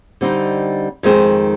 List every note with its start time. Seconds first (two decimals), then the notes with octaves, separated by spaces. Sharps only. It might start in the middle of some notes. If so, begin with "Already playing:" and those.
0.21 D3 G3 C4 D#4
1.03 F2 D#3 G#3 C4